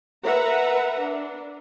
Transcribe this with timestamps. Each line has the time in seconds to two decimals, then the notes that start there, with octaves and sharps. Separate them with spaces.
0.25 A#4 B4 E5 F#5 A#5
1.00 D4